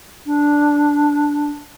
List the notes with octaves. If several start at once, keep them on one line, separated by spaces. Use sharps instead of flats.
D4